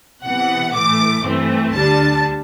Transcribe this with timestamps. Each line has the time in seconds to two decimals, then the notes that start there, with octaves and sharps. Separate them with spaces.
0.24 C3 E3 B3 F#5
0.74 A2 E3 A3 D6
1.24 G2 E3 A3 C4
1.74 D2 D3 G3 D4 A5